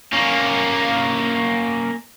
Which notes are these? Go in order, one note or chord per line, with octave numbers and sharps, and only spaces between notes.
A#3 C#4